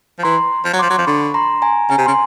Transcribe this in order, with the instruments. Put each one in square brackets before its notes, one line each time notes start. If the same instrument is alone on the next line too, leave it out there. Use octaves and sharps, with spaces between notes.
[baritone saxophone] F3
[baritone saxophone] E3 [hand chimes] A#5 C6
[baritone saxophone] F3
F#3
[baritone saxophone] F3 [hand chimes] C6 D6
[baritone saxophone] F#3
F3
[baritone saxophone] D3 [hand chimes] B5 C#6
[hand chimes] A#5 C6
G#5 A#5
[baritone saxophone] C#3 [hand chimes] G#5 A#5
[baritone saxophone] C3
[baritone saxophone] C#3 [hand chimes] C6